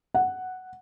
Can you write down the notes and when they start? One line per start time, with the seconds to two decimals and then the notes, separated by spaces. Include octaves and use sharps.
0.14 F#5